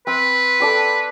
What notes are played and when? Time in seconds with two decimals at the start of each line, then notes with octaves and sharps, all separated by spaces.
0.07 C4 B4
0.60 A4 D5 G5